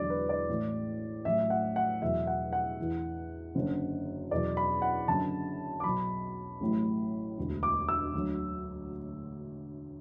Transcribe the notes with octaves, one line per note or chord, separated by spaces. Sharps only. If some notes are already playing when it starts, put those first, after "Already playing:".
Already playing: E1 E2 D3 F#3 D5
B4
D5
A1 A2 E3
A1 A2 F#3 E5
F#5
F#5
E2 B2 F#3 E5
F#5
F#5
E2 E3
F#1 F#2 D3 F#3
E2 B2 F#3 D5
B5
F#5
F#1 F#2 D3 F#3 A5
D6
B1 B2 F#3 B5
A1 A2 F#3
E1 D2 D3
D6
E6
D2 D3 F#3